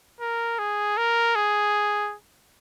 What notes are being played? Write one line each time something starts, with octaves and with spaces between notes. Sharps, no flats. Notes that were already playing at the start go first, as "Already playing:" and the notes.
A#4
G#4
A#4
G#4